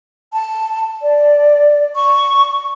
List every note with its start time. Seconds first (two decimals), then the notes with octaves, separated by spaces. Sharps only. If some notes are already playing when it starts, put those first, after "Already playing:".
0.33 A5
1.02 D5
1.96 C#6